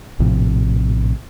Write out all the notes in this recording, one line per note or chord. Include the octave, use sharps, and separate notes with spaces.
A#1 A2 C3 F3